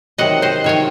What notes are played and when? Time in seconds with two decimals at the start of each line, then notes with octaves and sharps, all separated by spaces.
0.18 C3 D#3 F#3 D#5 F#5
0.42 C5 D#5
0.64 C3 D#3 F#3 A#4 C#5